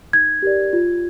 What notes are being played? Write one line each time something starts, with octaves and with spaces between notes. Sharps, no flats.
D#4 G#6
G4 A#4 D5
F4